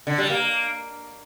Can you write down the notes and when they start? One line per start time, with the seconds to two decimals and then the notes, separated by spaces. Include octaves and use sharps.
0.07 D3
0.18 G3
0.30 A#3